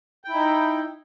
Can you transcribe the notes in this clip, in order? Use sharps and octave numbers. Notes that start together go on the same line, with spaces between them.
D#4 E4 G5